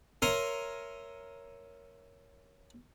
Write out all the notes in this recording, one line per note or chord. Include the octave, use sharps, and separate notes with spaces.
A#4 C#5 E5 G#5 A#5 C6